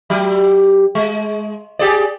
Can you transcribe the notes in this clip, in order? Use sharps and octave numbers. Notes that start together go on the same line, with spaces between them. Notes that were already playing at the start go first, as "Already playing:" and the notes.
F#3 G4
G#3
G4 G#4 D5